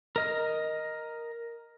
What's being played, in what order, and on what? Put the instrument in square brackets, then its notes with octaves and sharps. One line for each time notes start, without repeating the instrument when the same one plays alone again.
[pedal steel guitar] A#4 D#5 F6